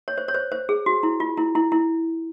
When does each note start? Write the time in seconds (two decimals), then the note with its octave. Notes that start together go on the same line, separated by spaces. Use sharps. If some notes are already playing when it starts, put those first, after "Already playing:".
0.08 C#5
0.18 C5
0.28 C#5
0.35 C5
0.52 C5
0.69 G#4
0.86 F#4
1.03 E4
1.20 F4
1.37 E4
1.55 E4
1.72 E4